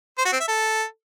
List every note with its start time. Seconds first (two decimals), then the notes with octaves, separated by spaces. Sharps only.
0.18 C5
0.25 F#4
0.33 C4
0.40 E5
0.48 A4